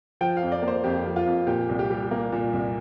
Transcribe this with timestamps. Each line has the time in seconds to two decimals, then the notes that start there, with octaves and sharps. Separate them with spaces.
0.21 F3 G5
0.37 F5
0.42 F2
0.52 D5
0.62 A#3
0.68 C5
0.84 F2 G4
1.06 F3
1.16 F4
1.26 F2
1.47 A#2 G4
1.69 C2
1.79 G4
1.90 G3
2.11 A#3
2.32 A#2
2.53 C2